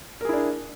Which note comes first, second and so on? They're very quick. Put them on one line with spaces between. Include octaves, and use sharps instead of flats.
A#4 G#4 E4 D4